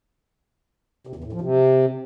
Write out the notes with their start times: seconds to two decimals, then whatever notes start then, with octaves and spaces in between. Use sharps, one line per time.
1.07 C3
1.16 E2
1.24 A2
1.33 F3
1.41 C3